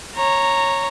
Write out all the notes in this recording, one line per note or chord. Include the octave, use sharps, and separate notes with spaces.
C#5 A#5